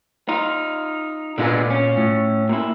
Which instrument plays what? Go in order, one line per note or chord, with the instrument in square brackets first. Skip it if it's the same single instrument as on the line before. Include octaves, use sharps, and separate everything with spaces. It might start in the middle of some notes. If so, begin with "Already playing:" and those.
[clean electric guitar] D#4 F4
[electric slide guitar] A#2 F4 G#5 [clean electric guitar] D3 G#3 B3
[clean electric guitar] C#4
[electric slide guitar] A2
[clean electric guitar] A#2 E4